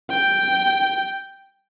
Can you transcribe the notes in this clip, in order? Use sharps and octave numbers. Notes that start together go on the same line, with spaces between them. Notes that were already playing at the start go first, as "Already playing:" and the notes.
G5